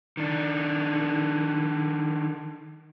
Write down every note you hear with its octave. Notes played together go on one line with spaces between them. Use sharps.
D#3 D4